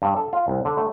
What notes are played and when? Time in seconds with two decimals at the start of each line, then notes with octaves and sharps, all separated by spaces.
0.02 G2
0.16 A4
0.33 F4
0.48 C2
0.65 D3
0.77 A3